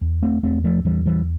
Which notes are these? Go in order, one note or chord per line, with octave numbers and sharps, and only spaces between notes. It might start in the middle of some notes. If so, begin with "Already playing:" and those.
E2
A3 C4
E2 A3 C4
F3 A3
E2 E3 G3
E3 G3